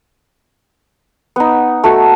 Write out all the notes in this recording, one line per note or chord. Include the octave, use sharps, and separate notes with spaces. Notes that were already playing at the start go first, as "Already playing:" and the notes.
B3 D#4
A3 F#4